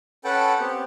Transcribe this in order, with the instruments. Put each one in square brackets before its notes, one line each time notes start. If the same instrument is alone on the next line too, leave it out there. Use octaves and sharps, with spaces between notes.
[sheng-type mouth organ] C#4 A4 B4 F#5 G5 A5
B3 C4 G4